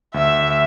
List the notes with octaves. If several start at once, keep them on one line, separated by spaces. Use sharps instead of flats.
D2 E5